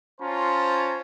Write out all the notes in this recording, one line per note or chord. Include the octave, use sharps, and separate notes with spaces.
C#4 F4 C5 C#5 A5 A#5